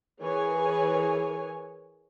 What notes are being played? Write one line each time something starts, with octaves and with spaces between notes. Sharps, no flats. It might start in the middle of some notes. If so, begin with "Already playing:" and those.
E3 G#4 A#4 C#5 G#5